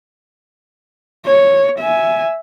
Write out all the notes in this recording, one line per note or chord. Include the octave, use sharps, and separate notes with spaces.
C#5
E5 G#5